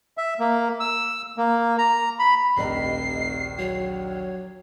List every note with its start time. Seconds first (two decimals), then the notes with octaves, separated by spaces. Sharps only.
0.18 E5
0.39 A#3
0.80 E6
1.37 A#3
1.78 A#5
2.19 B5
2.57 F1 A#1 D#2 D#5 A#5 C7
3.59 F#3 C#5